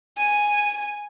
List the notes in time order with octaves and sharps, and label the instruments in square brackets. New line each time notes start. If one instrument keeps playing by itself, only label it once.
[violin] G#5